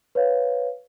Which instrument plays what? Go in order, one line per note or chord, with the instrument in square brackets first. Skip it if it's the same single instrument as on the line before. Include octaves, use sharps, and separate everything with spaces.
[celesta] B4 C#5 F5